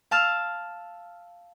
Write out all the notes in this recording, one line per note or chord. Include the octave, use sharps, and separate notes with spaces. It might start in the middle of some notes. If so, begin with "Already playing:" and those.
F5 A5 E6 F6